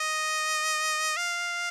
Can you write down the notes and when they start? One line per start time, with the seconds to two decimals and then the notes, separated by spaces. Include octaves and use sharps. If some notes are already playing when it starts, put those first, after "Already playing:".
Already playing: D#5
1.17 F5